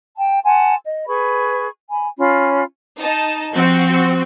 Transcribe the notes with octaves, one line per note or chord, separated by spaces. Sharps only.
G5 A5
F#5 G#5 A5 C6
D#5
G#4 B4 B5 C#6
G#5 B5
C#4 F4 B5
D#4 A5
F3 C4 F#4